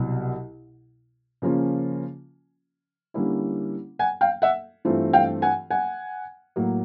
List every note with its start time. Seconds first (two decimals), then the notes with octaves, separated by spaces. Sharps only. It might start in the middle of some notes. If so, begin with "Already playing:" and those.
Already playing: C2 B2 F#3
1.42 C#3 F3 A#3 C#4 F4
3.14 D3 G3 A#3 C#4 E4
3.99 F#5 G#5
4.21 F5 G5
4.42 E5 F#5
4.85 G2 E3 A3 C4 F4
5.13 F5 G5
5.42 F#5 G#5
5.70 F#5 G#5
6.56 A2 F#3 A#3